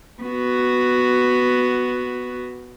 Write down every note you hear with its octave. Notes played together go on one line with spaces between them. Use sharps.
B3 F#4